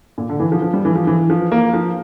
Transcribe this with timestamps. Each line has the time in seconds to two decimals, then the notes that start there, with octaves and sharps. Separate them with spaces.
0.18 A#2
0.29 D3
0.40 E3
0.52 F3
0.62 F3
0.74 G3
0.85 E3
0.95 F3
1.07 E3
1.30 F3
1.52 A#3
1.73 F3